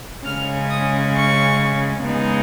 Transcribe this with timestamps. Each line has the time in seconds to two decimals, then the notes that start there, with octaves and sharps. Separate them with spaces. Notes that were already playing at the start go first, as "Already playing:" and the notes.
0.24 C#3 G#3 C#4 F6
0.69 D#6
1.14 C#6
2.03 C#3 G#3 B3 D#4